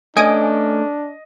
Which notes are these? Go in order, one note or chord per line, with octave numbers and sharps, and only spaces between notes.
A3 C#4 D4 D#5 G#5 D#6 D7